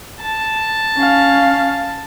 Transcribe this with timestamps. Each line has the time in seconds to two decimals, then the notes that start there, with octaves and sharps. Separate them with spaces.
0.22 A5
0.96 C#4 F5